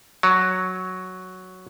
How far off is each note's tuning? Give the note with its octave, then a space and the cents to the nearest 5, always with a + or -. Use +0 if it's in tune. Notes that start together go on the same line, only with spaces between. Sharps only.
F#3 +0 C#5 +0